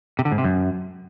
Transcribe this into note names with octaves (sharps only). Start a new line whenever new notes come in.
C3
D3
G#2
C3
F#2